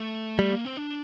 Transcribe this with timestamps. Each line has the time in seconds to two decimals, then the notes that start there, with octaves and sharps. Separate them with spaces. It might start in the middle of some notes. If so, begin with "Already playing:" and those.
Already playing: A3
0.39 G3 A3
0.52 A#3
0.65 C4
0.77 D4